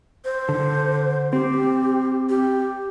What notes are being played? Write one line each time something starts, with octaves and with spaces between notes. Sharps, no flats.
C5
D3
C4 G4
G4